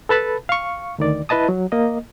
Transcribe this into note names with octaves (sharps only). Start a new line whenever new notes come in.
A4 B4 A5 B5
F5 C#6
D2 D#3 D5
E4 B4 D#5 A5 D#6
F#3
A#3 D#5